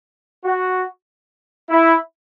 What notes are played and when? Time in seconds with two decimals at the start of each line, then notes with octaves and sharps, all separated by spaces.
0.45 F#4
1.70 E4